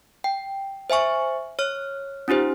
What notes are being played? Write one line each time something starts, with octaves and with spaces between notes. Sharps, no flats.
G5
C5 E5 G#5 C#6
C#5 F6
C#4 D#4 F4 G4 C5